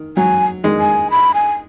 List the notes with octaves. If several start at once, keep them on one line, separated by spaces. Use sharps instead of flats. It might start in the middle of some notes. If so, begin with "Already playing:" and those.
Already playing: D#3
F#3 G#5
D#3 G#3
G#5
B5
G#5